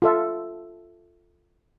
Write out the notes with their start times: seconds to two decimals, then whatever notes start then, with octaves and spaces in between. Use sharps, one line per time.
0.02 F4 A4 E5